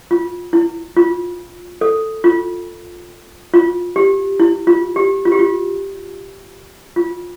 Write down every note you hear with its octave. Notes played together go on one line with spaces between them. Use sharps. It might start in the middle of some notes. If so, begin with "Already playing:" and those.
F4
E4
F4
A4
F4
F4
G4
E4
F4
G4
F4
G4
F4
F4